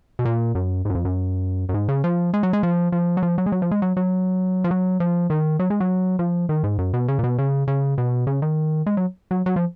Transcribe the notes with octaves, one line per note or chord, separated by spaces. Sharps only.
B2
A#2
F#2
G#2
F#2
F2
F#2
F#2
G#2
C#3
F3
G#3
F#3
G#3
F3
F3
F#3
F3
F#3
G#3
F#3
F3
G#3
F#3
F#3
F3
F#3
F3
D#3
F#3
G#3
F#3
F3
D#3
G#2
F#2
B2
C#3
A#2
B2
C#3
C#3
B2
C#3
D#3
G#3
F#3
F#3
F#3
F3